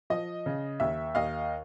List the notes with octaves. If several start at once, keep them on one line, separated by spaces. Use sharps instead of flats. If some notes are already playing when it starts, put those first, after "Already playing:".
F3 D#5
C#3
D#2 E5
D#2 D#5 F5